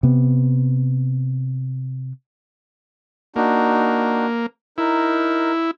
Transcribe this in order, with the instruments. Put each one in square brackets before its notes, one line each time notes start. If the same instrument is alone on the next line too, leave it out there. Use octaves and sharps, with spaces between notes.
[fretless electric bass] C3 B3
[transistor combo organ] A#3 [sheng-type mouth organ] D4 D#4 F#4
[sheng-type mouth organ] D#4 A#4 [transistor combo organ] E4